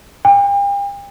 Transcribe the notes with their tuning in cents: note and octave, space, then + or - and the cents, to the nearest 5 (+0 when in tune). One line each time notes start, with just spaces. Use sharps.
G5 +40